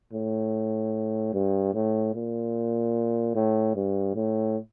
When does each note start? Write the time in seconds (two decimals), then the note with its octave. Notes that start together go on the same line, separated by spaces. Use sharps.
0.13 A2
1.34 G2
1.74 A2
2.14 A#2
3.35 A2
3.75 G2
4.15 A2